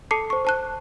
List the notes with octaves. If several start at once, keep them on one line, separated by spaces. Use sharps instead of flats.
A4 A5 D6 C7 C#7
C5 C#6
C5 A5 F#6